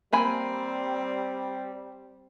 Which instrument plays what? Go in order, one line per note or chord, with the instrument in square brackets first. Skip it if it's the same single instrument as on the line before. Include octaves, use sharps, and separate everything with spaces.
[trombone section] G3 [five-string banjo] A#3 G#5 B5 [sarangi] C4